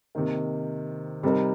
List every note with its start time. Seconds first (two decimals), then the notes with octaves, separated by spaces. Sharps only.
0.15 C3 D#3 A#3
1.23 C3 G3 C4 D#4 A#4